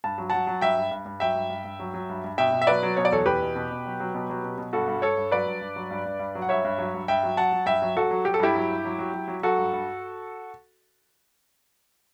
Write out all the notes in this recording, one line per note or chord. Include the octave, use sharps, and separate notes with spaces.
G2 A5
F#3
F#3 F#5 A5
F#3
G2 E5 G5
G2
G2
G2
F#3 E5 G5
G2
G2
G2
F#3
F#3
G2
G2
B2 E5 G5
B2
E5
F#3 B4 D5
F#3
B2 C#5
D5
E2 A4 C#5
E2 G4 B4
B2
B2
B2
F#3
F#3
B2
F#3
B2
B2
G2 F#4 A4
G2
G2 A4 C#5
G2
F#3 B4 D5
G2
G2
F#3
G2
G2
G2
F#3
F#5
G2 C#5 E5
G2
F#3
G2
G2 E5 G5
F#3
F#3 F#5 A5
F#3
G2 E5 G5
F#3
F#3 F#4 A4
F#3
F#3 G4
A4
G2 E4 G4
F#3
G2
F#3
F#3
F#3
F#3
F#3 F#4 A4
G2
G2